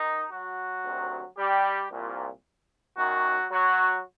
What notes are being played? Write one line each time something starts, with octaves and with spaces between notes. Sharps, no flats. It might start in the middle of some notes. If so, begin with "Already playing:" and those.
Already playing: D#3 D#4
F#3 F#4
D2 C3 D#3
G3 G4
C2 A#2
F#2 D#3 F#3 F#4
F#3 F#4